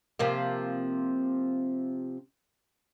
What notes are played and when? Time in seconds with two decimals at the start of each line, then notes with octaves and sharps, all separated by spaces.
0.19 C3 F3 A#3